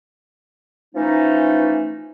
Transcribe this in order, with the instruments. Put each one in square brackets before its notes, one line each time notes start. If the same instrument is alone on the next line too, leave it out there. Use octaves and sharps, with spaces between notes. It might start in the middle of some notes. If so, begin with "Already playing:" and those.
[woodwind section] E3 F3 A3 C#4 D#4